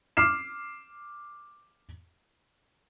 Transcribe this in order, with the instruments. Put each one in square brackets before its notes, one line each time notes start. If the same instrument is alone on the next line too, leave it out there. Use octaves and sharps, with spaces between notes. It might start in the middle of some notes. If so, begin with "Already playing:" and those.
[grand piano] D6 F6 C7 E7